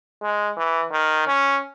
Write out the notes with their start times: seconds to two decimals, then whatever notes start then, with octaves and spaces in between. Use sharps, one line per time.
0.23 G#3
0.58 E3
0.92 D#3
1.28 C#4